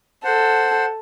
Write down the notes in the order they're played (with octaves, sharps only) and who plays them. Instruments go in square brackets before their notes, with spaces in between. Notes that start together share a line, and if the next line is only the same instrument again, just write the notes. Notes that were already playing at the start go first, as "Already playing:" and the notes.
[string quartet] A4 [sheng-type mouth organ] C5 F#5